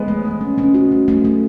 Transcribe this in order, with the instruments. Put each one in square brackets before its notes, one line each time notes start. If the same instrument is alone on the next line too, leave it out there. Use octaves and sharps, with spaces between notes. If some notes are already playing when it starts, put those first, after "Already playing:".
Already playing: [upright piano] G#3 B3
[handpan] A3
A3
C#4
C#4
F#4
A3
A3
A3